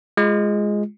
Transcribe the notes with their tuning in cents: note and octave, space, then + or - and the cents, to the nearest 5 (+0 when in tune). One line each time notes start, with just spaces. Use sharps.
G#3 +0 F4 +0